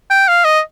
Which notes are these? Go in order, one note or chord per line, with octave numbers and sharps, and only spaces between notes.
G5
F5
D#5